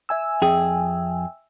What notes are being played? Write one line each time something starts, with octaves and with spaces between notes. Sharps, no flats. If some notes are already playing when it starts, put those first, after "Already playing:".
E5 G#5 E6
F2 G#4 G5